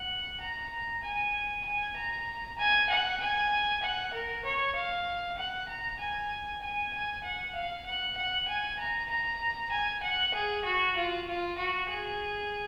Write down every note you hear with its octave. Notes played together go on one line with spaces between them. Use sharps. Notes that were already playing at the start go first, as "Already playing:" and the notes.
Already playing: F#5
A#5
G#5
G#5
A#5
G#5
F#5
G#5
F#5
A#4
C#5
F5
F#5
A#5
G#5
G#5
G#5
F#5
F5
F#5
F#5
G#5
A#5
A#5
G#5
F#5
G#4
F#4
F4
F4
F#4
G#4